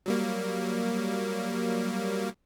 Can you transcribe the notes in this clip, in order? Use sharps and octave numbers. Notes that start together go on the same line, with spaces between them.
F#3 G3 A#3